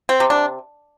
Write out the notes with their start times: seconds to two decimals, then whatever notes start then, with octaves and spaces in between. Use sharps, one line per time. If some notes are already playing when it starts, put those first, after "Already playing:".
0.09 C4
0.20 C3
0.30 D4